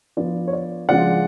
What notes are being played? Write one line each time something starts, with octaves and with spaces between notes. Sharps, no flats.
F3 B3 D4 D5
C#5
D5
C#3 F3 G#3 D4 D5 F#5